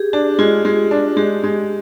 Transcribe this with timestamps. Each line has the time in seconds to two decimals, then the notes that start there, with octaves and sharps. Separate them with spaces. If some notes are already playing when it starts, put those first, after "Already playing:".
Already playing: G4 G#4
0.13 D4 G4
0.38 G#3 F4
0.65 G#3
0.91 D4
1.16 G#3 G4
1.43 G#3